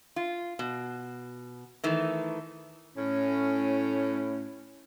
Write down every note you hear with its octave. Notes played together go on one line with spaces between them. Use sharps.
F4
B2
D#3 E3 A3
A2 C#4